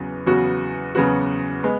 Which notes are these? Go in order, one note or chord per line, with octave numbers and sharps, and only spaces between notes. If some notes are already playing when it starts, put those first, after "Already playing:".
Already playing: E2 C#3 F#3 B3
E2 C#3 F#3 B3 F#4
E2 C#3 F#3 B3 F#4
G#3 B3